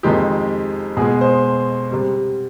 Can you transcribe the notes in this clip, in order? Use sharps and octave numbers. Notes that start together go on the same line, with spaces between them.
F2 C3 D#3 G#3 G4
B2 G#3 G#4
C5
C3 G3